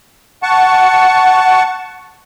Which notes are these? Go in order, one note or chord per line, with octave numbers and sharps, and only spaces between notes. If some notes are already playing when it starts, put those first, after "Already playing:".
F#5 A5 C#6